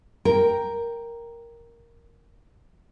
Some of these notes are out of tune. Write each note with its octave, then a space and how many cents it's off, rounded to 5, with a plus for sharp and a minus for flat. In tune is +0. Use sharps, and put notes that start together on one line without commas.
A#4 +0 G5 +0